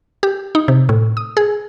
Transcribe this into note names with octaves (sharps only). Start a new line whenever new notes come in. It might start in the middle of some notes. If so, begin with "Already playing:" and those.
G4
D#4
C3
A2
D#6
G#4